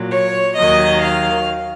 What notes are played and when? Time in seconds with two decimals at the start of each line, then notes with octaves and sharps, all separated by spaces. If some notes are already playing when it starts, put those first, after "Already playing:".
Already playing: A#2 F#3
0.11 C#5
0.57 D#2 D#3 F#3 D#5
1.02 F5